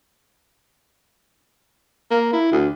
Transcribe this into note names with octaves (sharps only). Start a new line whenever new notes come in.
A#3
E4
D2